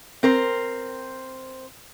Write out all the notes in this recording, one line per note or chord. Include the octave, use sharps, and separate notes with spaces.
C4 A#4 C5